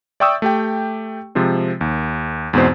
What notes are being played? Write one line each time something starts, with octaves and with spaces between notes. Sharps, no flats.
D5 E5 G5 C#6 D#6 E6
A3 G4 G5
C3 F3 G#3 C4
D#2
E2 G#2 B2 C4 C5